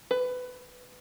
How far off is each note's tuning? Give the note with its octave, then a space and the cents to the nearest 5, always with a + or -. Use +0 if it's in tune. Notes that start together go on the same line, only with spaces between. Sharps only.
B4 +20